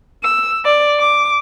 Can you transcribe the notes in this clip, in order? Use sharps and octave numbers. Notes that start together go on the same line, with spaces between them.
E6
D5
D6